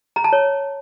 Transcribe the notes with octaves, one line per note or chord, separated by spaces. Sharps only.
A#5
A5
C#5